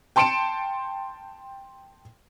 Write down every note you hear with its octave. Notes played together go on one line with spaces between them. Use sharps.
G5 A5 C6 C#7 D7 E7